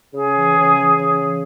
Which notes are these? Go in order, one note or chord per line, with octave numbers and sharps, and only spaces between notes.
C#3 G#4
E3
C#3
E3
C#3
E3